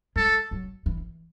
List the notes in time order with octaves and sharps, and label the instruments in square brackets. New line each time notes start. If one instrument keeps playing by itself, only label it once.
[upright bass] G#3 [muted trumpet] A4
[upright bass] F#3
E3